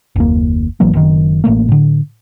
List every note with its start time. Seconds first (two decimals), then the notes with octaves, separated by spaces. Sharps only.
0.16 F#1 D#2 A#3
0.80 G#1 E3 F#3 A#3
0.93 F#1 F#2 D#3
1.44 A1 E3 A3 A#3
1.69 A2 D3